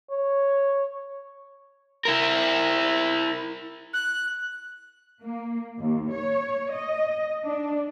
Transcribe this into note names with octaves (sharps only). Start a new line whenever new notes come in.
C#5
E4 A#4
F#6
A#3
D#2
C#5
D#5
D4